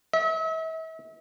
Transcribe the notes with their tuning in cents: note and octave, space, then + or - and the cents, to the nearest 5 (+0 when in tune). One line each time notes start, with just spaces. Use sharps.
E5 -40